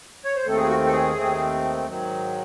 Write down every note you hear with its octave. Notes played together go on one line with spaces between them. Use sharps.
C#5
C5
D#2 D#3 A3 C4 A4
G#4
F#4
A4
G#4
D#2 D#3 A3 C4
G#2 D#3 F#3